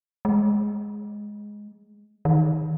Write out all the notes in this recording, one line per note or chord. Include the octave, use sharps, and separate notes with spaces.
G#3
D#3